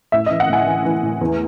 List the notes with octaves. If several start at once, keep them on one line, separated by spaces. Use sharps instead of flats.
A2 E5
E3 D#5
F#5
A2 G#5
E3
E3
A2
E2